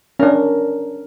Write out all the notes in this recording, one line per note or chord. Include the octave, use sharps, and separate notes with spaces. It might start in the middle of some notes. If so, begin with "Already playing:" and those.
C#4 D4 A#4